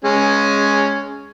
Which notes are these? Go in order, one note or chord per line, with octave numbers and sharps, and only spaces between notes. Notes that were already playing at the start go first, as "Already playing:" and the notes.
G#3 C#4